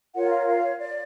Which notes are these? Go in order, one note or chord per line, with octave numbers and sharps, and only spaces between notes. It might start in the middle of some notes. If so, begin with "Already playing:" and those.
F4 A#4 C#5 F#5
F5
F5
C#5
D5